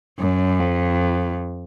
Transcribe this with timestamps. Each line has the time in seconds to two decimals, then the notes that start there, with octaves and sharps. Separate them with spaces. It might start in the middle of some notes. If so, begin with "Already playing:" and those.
0.19 F#2
0.59 F2